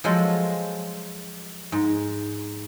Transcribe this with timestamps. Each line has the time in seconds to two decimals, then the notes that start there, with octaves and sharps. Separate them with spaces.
0.04 F3 F#3 G#3 F4 A4
1.72 G#2